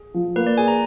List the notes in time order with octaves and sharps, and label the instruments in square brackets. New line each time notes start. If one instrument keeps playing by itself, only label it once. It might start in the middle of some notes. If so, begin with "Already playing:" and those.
Already playing: [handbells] G#4
[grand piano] F3
[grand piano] A#3 [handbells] B4
[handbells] D5
[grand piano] G#4 [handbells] G#5
[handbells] A#5